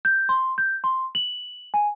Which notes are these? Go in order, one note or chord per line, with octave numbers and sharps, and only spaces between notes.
G6
C6
G6
C6
F#7
G#5